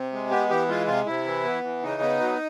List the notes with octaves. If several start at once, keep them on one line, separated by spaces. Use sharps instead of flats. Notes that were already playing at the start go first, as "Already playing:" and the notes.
Already playing: C3
G#3
B3 G4
E3 G4
G#3 F4
C3 F4
C3 E4
E3
B3
E3
C#3 D#4
B3
F#3